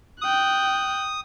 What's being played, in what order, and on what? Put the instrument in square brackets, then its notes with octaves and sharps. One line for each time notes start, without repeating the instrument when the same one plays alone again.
[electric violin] G5 F#6 [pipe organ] D#6